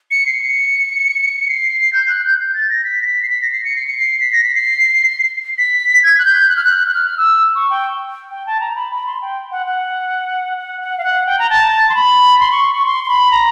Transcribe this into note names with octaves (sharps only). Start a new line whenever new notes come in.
C#7
C7
C#7
C7
G6
F#6
G6
G6
A6
A#6
B6
A#6
B6
C7
B6
A#6
C7
C#7
C7
C#7
C7
B6
A#6
B6
C7
B6
G#6
F#6
G6
F#6
F6
F#6
F#6
F6
E6
C#6
G5
G5
A5
A#5
B5
B5
C6
G5
F#5
F#5
F#5
F#5
F5
F#5
G5
A#5
A5
C6
B5
C6
C#6
C#6
C6
C6
B5
A#5